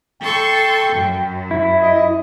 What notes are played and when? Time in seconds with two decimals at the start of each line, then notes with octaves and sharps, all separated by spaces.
0.21 A4 G5 C6 C#6
0.93 F#2
1.51 E4
1.82 D#5